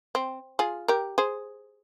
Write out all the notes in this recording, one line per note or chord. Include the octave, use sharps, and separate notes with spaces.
C4
F4 G#4
G4 A#4
G#4 C5